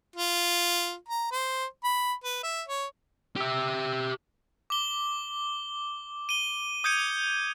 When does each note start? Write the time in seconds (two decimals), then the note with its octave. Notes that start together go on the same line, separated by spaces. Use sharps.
0.16 F4
1.09 A#5
1.32 C5
1.84 B5
2.24 B4
2.43 E5
2.68 C#5
3.36 G4 E5
4.70 D6 G7
6.29 D#7 G7
6.84 D#6 G6 G#6 C#7 D#7